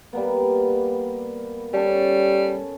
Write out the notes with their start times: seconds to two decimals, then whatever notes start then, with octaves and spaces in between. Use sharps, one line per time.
0.13 G3 A#3 B3
1.73 G3 C#4 A4